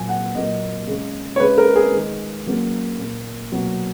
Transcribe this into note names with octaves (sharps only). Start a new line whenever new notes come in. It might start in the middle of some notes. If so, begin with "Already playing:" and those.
Already playing: A#2 F#3 A#3 G#5
F#5
A#2 F#3 A#3 D#5
C#3 G#3
C#5
C#3 G#3 B4
A#4
G#4
D#3 G#3
C#3 F#3 A#3
A#2 A#3
B2 F#3 A#3